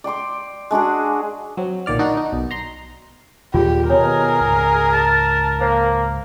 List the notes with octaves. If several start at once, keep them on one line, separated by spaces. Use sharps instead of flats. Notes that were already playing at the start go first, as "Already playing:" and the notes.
D5 G5 C6 D6
G#3 D4 F#4 G#4
F#3 C4
B1 A#2 D#3 D5 F6
D#3 D4 D#4 F#4 D5
D#4
B1
A#5 C6
D#2 A#2 G3 F4 G4 G#4
B2 D#3 B3 G#4 A#4 C#5
C#2 G#2
A5
A#3 C5 F5